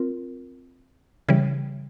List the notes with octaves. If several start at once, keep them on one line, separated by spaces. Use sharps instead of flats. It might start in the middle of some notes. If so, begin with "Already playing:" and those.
Already playing: C4 F4 A#4
C#3 E3 G3